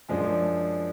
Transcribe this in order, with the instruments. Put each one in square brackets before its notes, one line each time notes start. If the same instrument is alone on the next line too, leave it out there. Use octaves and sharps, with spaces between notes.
[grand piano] F#2 F3 G#3 D4